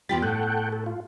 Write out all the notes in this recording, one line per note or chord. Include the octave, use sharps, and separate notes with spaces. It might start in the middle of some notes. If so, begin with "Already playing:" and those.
E2 F4 G4 G5 B5 A6
A2 A4 F#5 G5
A4
F4